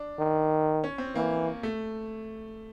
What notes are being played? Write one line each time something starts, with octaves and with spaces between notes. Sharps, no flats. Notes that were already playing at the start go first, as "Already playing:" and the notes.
Already playing: D4
D#3
C#4
C4
E3 A#3
A3